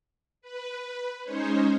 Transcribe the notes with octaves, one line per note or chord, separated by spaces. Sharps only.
B4
G#3 C#4 D#4 C5 C#5